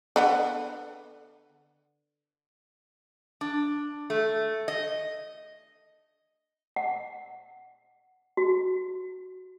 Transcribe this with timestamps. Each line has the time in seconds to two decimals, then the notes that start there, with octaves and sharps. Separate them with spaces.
0.16 D3 B3 F#5
3.41 D4
4.10 A3
4.68 D#5
6.76 F#5
8.37 F#4